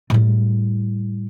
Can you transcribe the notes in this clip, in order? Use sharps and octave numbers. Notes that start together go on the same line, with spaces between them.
A2 G3